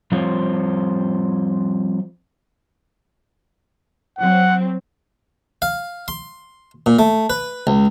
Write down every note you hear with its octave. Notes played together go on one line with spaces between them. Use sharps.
F3 G3 C4 F4 C5 C#5
F#3 C4 F#5
F5
C6
A#2
A3
B4
C#2